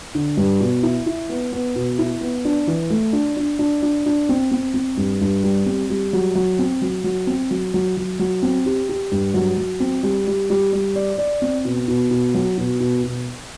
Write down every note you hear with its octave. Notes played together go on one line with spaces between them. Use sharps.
D3
G2
B2
E4
E4
B3
B3
B2
E4
B3
D4
E3
A3
D4
D4
D4
D4
D4
C4
C4
C4
G2
G2
G3
C4
G3
F#3
F#3
C4
F#3
F#3
C4
F#3
F#3
F#3
F#3
C4
G4
G4
G2
F#3
F#3
C4
G3
G3
G3
G3
D5
D5
C4
B2
B2
B2
F#3
B2
B2
B2